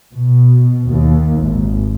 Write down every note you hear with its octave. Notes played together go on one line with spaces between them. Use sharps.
B2
D#2
G#1